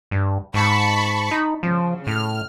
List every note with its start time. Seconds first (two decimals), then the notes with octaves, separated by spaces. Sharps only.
0.11 G2
0.54 G#2 A5 B5 C#6
1.31 D#4
1.63 C#3 F3
2.07 A2 F6